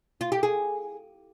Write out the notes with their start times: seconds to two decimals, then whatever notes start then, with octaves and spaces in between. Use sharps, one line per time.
0.21 F4
0.32 G4
0.43 G#4